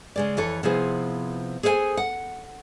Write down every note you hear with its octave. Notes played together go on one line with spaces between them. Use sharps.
C#3 G#3 D5
F2 E3 A4 C#5
C3 F3 B3 E4 G#4 C5
G#4 A4 C5 E5 G#5
F#5